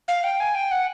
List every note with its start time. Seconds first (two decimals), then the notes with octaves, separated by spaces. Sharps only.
0.08 F5
0.24 G5
0.40 G#5
0.55 G5
0.71 F#5